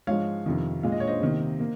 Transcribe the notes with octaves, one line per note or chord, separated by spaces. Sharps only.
G#2 F3 G#3 C#5 F5
F2 C3 D#3
A#2 G#3 F5
D#5
C#5
C5 D#5
C3 D#3 A#3
A#3